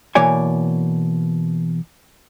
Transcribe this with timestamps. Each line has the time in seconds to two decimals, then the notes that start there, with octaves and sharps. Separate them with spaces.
0.15 B2 E3 A#3 C#5 D5 G#5